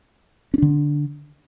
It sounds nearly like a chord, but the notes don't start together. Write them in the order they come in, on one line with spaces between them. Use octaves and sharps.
C#4 D4 D3